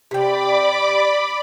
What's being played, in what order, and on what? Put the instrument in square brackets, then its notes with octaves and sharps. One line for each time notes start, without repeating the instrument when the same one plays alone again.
[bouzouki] C3 G5 [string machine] D5 B5 D6